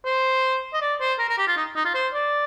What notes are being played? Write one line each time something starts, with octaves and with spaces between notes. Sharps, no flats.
C5
D#5
D5
C5
A#4
A#4
G4
F4
D#4
D#4
F4
C5
D5